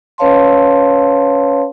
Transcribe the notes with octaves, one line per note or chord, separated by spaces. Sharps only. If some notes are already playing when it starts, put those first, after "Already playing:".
C#4 B4 C#5 F5 A5 C6